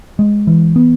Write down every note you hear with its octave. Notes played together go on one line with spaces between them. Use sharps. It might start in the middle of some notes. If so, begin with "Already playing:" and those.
G#3
E3
B3